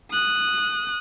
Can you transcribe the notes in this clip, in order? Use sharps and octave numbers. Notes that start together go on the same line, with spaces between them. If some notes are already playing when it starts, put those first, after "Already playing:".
D#6 F#6